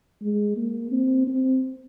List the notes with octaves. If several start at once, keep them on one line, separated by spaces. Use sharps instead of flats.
G#3
A#3
C4
C4